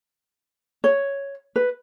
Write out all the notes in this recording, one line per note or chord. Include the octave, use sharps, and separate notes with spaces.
C#5
B4